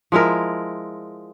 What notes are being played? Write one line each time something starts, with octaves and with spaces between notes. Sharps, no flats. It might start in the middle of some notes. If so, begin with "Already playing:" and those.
F3 G#3 E4 A#4